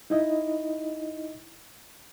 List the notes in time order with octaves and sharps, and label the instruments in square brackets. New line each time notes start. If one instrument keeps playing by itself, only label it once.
[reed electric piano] D#4 E4 D#5